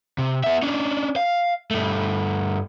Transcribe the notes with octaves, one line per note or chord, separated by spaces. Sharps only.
C3
B3 E5
C#4 D4
F5
G2 A3